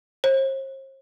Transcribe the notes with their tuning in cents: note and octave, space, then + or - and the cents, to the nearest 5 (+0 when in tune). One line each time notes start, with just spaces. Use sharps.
C5 +40